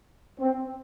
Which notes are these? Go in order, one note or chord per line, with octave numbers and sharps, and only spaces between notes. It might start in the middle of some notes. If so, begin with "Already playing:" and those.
C4